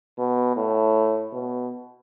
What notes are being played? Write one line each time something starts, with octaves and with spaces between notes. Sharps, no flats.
B2
A2
B2